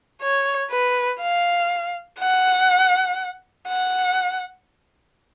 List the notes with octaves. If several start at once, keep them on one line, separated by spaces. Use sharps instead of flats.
C#5
B4
F5
F#5
F#5